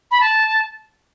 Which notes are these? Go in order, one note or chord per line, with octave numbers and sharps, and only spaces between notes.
B5
A5